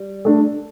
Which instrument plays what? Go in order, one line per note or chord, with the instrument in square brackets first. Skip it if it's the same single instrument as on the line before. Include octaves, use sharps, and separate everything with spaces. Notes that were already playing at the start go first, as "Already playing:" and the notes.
Already playing: [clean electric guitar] G3
[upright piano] A3 D4